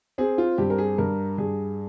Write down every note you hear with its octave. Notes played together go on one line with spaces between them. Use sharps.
C4 G#4
F4
G2 G4
A#4
G#4
G2 A#4
G2 G#4